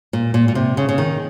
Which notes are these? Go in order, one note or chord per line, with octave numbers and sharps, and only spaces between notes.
A#2
A#2
A#2
C3
C#3
C#3
D#3